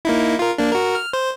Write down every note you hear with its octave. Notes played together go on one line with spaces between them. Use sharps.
A#3 D#4 E4
F4 A#4
A#3 D4
F#4 A#4
F6
C5